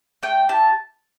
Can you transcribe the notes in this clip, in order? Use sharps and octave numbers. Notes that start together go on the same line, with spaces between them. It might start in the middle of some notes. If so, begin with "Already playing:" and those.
A3 G5
E4 G4 A5